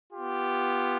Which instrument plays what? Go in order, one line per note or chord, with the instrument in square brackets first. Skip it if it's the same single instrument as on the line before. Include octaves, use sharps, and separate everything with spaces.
[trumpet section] B3 F4 G4